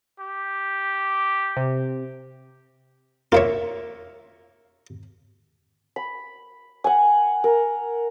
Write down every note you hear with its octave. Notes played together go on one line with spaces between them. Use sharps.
G4
C3
A#3 F4 C5 C#5 E5
B5
F#5 G#5
A#4